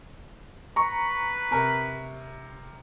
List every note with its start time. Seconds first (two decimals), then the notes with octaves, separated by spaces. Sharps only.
0.76 B4 A#5 C#6
1.51 C3 A#4